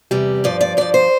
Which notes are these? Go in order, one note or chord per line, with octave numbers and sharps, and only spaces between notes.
E2 C3 G3
G2 F3 D5
D5
G2 F3 D5
C5